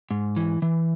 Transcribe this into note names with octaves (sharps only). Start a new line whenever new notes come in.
G#2
E3
E3